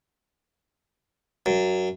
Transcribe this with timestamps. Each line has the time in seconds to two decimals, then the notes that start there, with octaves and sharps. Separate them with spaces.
1.46 F#2